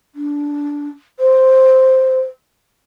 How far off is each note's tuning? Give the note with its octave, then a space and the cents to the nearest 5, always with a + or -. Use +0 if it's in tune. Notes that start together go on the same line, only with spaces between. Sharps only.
D4 -15
C5 +0